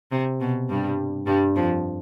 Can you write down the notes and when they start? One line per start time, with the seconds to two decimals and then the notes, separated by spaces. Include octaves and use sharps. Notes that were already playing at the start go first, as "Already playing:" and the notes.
0.12 C3
0.41 B2
0.70 G2 G3
1.27 G2 G3
1.56 F2 F3